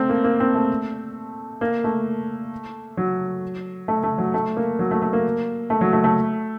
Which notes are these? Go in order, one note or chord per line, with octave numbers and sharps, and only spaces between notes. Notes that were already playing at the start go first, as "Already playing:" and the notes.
Already playing: A3 C4
A#3
A#3
C4
A3
A#3
A3
F#3
A3
A3
F#3
A3
A#3
F#3
A3
A3
A#3
A3
F#3
A3
A3